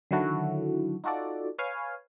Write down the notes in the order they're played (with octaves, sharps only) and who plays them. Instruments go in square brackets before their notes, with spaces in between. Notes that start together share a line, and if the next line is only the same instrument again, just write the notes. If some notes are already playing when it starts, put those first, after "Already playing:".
[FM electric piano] D3 D#3 F#3 E4 F#4 A4
D#4 F4 F#4 A4 D5
B4 C#5 F5 G#5